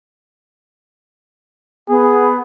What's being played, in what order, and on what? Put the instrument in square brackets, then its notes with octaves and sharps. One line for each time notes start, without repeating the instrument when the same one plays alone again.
[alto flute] B3 [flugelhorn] G#4